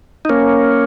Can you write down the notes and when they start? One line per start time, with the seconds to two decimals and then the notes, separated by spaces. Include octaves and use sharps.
0.25 D#4
0.29 A#3 C#4